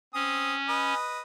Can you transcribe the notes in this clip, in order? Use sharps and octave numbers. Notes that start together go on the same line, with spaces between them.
C4 C#4 D#6
B4 D#5